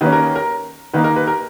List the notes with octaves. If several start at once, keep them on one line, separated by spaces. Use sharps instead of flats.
D#3 A#3 C#4 B4
A#4
A#4
D#3 A#3 D#4 B4
A#4
B4
A#4